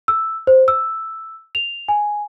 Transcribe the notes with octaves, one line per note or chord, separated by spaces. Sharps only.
E6
C5
E6
F7
G#5